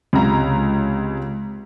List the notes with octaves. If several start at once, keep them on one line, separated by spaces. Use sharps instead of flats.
C#2 C3 A#5